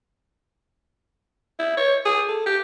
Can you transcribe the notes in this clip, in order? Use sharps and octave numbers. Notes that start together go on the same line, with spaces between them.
E4
C#5
G#4
A4
G4